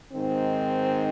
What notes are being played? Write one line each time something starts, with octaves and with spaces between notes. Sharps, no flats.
G#2 D#3 C4